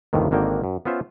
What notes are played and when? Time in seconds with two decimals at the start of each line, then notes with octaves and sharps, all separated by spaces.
0.13 G1 D#2 A2 C3 D#3
0.31 G#1 D3 D#3 A#3 F#4 G5
0.64 F#2
0.85 B3 C#4 F4 C5 E5